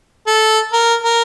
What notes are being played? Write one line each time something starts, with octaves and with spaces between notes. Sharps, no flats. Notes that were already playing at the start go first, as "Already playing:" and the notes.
A4
A#4
A#4